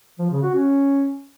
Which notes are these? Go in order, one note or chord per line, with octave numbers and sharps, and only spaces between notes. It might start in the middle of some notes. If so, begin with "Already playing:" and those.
F3
C#3
F#4
C#4